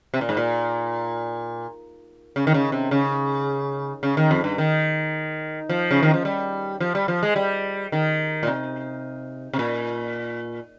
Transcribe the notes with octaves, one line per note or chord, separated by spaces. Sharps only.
C3
A#2
G#2
A#2
C#3
D#3
C#3
C3
C#3
C#3
D#3
F2
G2
D#3
F3
C#3
D#3
F3
G3
F3
G3
F3
G#3
G3
D#3
A#2
C3
C3
A#2